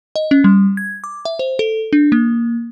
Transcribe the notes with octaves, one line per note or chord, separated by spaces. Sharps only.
D#5
C#4
G3
G#6
D6
E5
C5
A4
D4
A#3